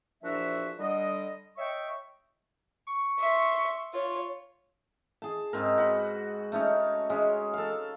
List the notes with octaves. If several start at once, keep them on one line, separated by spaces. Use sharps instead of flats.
E2 A#2 F3 D4 F#4 E5
D3 G3 D#5
C#5 D#5 E5 G5 C#6
C#6
E5 C6
F4 C#5
G#4 A5
G#2 C4 A#4
F#4 B4
A3 C#4 D#4 C#5
G#3 C#4 G#4
A4 F5